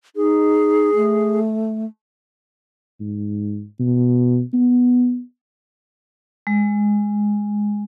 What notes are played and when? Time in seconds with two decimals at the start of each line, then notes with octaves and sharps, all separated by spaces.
0.16 D#4 G#4
0.96 A3
3.00 G#2
3.80 B2
4.53 B3
6.47 G#3